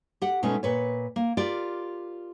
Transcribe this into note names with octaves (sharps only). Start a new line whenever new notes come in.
G4 F#5
B2 G#3 A3 C#4 D#4
A#2 B4 C#5
A#3
F4 G4 A#4 D5